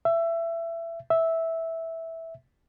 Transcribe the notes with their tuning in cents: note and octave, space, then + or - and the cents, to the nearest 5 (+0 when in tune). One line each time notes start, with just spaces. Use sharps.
E5 +20
E5 -10